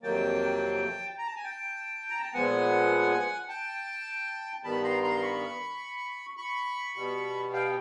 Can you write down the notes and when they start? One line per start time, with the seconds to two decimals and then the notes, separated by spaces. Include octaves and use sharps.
0.02 F2 C3 D#3 F#3 A#3 G5 A5
1.18 A#5
1.26 A5
1.36 G#5
1.44 G5 A5
2.10 A#5
2.23 A5
2.34 A#2 F3 G#3 B3 F#5 G#5
3.48 G5 A5
4.64 G2 D#3 G3 B3 A5 B5
4.84 A#5 C6
5.03 A#5 C6
5.18 C6
5.22 B5 C#6
6.37 B5 C#6
6.95 B2 G3 B3
7.53 F5 G5